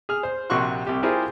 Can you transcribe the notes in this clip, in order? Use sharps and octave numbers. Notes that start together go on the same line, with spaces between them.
G#4 F6
C5
A#1 C3 F#4 C6 C#6 F#6
C2 G4
E4 F4 G4 G#4 A#4 C5